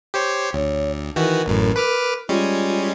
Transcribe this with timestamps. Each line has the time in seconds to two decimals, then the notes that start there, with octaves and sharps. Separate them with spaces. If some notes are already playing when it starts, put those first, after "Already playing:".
0.14 G4 C5 C#5
0.53 D2 C#5
1.16 D#3 E3 F#4 A#4
1.46 A1 F#2 A2
1.76 B4 D6 F6
2.29 G3 G#3 C#4 F4